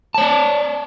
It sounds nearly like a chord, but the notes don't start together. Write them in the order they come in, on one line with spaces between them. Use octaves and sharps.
A5 C#5 D5